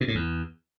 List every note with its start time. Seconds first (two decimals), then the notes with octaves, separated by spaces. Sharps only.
0.01 B2
0.08 A2
0.15 E2